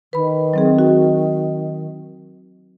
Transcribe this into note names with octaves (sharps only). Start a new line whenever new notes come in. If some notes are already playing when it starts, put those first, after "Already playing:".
D#3 B4 B5
F#3 C4 G#4
F#4